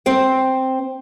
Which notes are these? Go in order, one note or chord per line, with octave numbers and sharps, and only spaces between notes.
C4 C5 G5